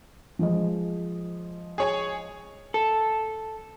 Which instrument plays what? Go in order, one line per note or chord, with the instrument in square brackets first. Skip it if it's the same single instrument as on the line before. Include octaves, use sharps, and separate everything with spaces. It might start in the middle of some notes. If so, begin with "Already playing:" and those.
[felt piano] F3 G#3 D#5
[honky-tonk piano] G#4 C#5 G#5
[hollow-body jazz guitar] A4